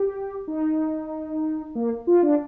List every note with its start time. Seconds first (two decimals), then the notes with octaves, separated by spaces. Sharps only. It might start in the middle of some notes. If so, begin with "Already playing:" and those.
Already playing: G4
0.48 D#4
1.75 A#3
2.07 F4
2.23 D4